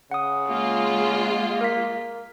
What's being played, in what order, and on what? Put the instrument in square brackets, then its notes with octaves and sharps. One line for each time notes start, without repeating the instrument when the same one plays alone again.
[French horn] C#3 [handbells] F#5 D#6
[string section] G#3 F4 [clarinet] A#3
[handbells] A#4 B6